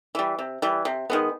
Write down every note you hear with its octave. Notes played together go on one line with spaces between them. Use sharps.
E3 G3
C3
E3 G3
C3
D#3 G#3 B3